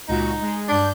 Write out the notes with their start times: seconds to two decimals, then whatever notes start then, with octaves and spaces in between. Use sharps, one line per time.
0.08 C#2 A#2 D#4 F#4
0.41 G#3
0.69 G2 D4 G6